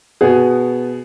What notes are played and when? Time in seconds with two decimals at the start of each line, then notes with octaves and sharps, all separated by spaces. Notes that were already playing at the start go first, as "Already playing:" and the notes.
0.21 B2 B3 G#4